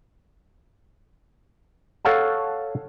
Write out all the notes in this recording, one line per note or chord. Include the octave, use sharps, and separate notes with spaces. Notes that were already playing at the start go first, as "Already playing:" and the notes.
A4 C#5 F5 F#5 A5